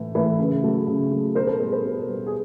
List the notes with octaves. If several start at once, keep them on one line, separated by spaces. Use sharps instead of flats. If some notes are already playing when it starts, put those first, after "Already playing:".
Already playing: A2 E3 A3
E3 A3
C#3
F#3 A3
C#3
F#3 A3
B2 A#4 C5
A4 B4
G3 B3 G#4 A#4
A4 B4
B2
G3 B3
G#4